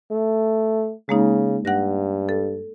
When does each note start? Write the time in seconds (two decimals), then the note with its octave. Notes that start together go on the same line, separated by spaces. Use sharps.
0.11 A3
1.09 C#3 G#3 A#3 D#4
1.65 G2 F#5 F#6 A#6
2.29 A4